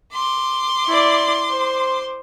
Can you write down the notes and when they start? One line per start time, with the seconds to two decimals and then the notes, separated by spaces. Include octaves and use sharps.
0.13 C6 D6
0.87 E4 D5
1.49 C5